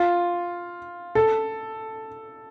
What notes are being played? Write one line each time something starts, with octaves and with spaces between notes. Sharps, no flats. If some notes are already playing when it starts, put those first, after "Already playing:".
Already playing: F4
A4